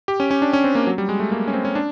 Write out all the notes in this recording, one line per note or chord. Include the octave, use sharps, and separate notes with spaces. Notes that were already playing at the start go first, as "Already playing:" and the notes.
G4
C#4
C#4
D4
C#4
C4
A#3
F#3
G3
G#3
A3
A#3
C#4
C4
C#4
D4